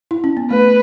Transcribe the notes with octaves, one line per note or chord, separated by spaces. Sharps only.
E4
C#4
B3
A3 B4